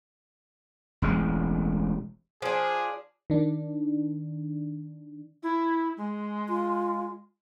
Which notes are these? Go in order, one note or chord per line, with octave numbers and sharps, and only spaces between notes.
E1 A1 G#3
F3 D4 G#4
D#3 D4
E4
G#3
F4